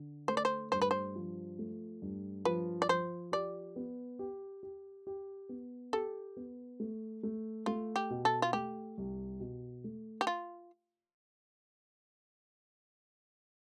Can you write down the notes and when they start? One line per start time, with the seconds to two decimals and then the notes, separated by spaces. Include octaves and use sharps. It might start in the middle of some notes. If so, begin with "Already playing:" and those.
Already playing: D3
0.28 A3 C5
0.37 D5
0.45 C5
0.72 G2 C5
0.82 B4
0.91 C5
1.16 F3
1.59 A3
2.02 G2
2.45 F3 B4
2.82 D5
2.89 F3 C5
3.32 G4 D5
3.76 B3
4.19 G4
4.63 G4
5.07 G4
5.49 B3
5.93 G4 A4
6.37 B3
6.80 A3
7.23 A3
7.66 A3 F4
7.96 G4
8.10 B2
8.25 A4
8.42 F4
8.53 A3 G4
8.97 C2
9.40 B2
9.84 A3
10.21 G4
10.27 F4